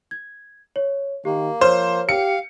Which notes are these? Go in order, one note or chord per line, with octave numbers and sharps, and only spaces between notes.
G#6
C#5
D#3 A#3 G4
F3 A#4 C5 C#5 F6
G4 F5 C#7